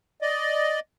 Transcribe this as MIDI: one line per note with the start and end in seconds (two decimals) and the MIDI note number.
0.22 0.80 74
0.22 0.80 75